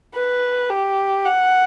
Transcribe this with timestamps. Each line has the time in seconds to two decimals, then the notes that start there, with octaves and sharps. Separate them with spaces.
0.15 B4
0.70 G4
1.25 F#5